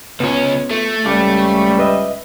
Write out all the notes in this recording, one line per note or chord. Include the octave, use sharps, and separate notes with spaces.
C#2 B3 C#4 F4
A3
C#2 G3 F5 A5 D6
B4 D#5 E5